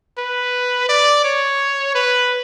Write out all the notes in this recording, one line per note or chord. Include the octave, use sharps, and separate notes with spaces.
B4
D5
C#5
B4